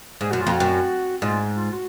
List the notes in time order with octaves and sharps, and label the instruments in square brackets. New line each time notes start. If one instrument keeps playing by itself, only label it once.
[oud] G#2 [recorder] G#4
[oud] F#2 [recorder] F#4
[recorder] F4
[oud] F2
[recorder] F#4
[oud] F#2
[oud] G#2 [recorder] F4
[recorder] F4
F#4